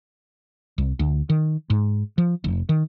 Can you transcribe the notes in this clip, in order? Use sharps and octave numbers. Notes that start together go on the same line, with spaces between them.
C2
D2
D#3
G#2
F3
F1
D#3